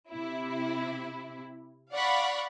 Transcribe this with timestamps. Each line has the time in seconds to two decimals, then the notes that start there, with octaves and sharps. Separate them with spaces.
0.11 C3 E4
1.92 D5 F5 F#5 B5 C#6